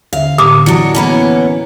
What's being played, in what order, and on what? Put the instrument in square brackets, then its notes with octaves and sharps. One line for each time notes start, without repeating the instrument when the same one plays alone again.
[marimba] D#2 D3 E5 [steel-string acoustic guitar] F5
[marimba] A2 D3 F6 [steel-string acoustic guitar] A#3 [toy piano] D6 D#6
[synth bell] E3 E4 C#7 [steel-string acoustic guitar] F#3 D4
[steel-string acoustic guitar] A#3 B3 C#4 [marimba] A#5 B5